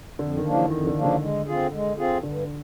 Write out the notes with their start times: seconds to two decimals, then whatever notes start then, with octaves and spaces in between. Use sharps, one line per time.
0.19 F2 D3
0.37 D#3
0.45 C#3 F3 A#3 D4
0.54 E3
0.70 F2 D#3
0.87 D3
0.96 C#3 F3 A#3 D4
1.04 D3
1.22 G#3
1.46 C4 F4 G#4
1.73 G#3
1.98 C4 F4 G#4
2.23 G2 D3